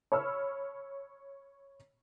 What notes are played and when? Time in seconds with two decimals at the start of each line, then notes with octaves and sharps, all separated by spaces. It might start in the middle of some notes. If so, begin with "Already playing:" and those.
0.12 C#5 B5 E6 F6